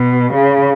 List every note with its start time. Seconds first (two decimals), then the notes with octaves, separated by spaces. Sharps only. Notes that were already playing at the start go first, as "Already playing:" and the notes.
Already playing: B2
0.34 C#3